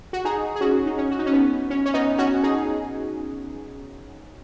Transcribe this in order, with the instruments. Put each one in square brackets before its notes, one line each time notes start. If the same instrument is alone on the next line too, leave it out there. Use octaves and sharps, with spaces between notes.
[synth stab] F#4
D#4 G#4
G#4
C#4 F#4
D#4
C#4
F#4
D#4
C#4
B3
C#4
C#4
B3 D#4
C#4 F#4
D#4 G#4